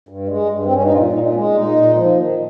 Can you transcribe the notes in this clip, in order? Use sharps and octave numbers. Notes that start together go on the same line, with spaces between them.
G2
G#3
G2
C4
G2 C#4
D#4
A#2 F4
A#2 D#4
G#3 C#4
A#2 D#4
A#2
F3
D#3